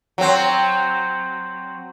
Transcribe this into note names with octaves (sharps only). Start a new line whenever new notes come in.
F#3 C4